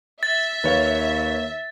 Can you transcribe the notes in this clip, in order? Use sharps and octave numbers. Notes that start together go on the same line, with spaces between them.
E5 A6
D#2 B4 C#5 F5